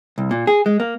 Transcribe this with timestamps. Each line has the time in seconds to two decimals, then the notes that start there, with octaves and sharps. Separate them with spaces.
0.18 C2
0.31 A#2
0.47 G#4
0.66 G#3
0.80 A#3